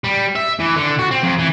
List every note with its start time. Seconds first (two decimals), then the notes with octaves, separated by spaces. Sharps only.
0.04 G3
0.35 E5
0.59 E3
0.76 D3
0.99 F#4
1.11 C4
1.23 F2
1.39 E3